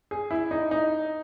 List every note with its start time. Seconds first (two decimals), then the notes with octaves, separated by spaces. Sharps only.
0.11 G#4
0.31 E4
0.51 D#4
0.71 D#4